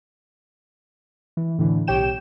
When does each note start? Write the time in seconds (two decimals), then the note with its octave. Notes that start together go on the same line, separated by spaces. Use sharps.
1.37 E3
1.59 A2 D3 E3
1.87 B1 G4 C#5 G5 E7